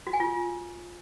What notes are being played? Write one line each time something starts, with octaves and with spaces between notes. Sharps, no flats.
F#4
G#5
F4